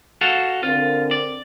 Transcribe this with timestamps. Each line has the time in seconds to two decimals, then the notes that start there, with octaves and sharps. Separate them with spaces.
0.21 F#4 A4 F5
0.63 D3 C4 F4 A#4
1.11 D5